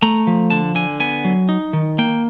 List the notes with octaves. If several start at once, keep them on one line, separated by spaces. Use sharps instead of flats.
A3 A#5
F3
D3 A5
D3 G#5
B3 G#5
F#3
D#4
D#3
A#3 G5